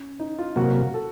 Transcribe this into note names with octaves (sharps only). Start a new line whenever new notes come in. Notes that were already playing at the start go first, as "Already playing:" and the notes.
Already playing: C#4
D#4
F4
C3 F#3 A#3 F#4
A4